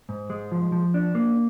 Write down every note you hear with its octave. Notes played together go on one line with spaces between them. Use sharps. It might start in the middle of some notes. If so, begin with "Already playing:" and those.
G#2
G#3
F3
F3
D4
A#3